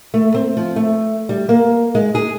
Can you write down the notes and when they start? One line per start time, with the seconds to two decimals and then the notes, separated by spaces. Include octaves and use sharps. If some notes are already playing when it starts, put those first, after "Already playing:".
0.14 A3
0.34 C4
0.57 F3
0.76 A3
1.29 G3
1.49 A#3
1.95 G#3
2.15 G#4